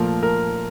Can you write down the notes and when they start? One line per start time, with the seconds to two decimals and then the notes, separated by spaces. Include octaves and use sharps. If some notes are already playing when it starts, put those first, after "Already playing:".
Already playing: A#2 F3 A3 A#4
0.23 A#4